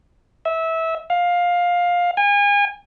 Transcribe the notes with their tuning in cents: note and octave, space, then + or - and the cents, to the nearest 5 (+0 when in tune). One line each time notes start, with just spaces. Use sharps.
E5 -20
F5 +15
G#5 -35